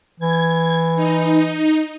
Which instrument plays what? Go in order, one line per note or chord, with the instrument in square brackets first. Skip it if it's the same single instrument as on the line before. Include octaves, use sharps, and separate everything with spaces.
[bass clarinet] E3 [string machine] G#6
[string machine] D#4